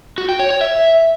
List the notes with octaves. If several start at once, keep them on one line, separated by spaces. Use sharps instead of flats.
F#4
G5
C#5
C#5
E5